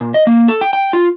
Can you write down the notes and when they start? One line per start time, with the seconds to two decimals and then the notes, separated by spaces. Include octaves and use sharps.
0.01 A#2
0.14 D#5
0.27 A#3
0.48 A4
0.61 G5
0.73 G5
0.93 F4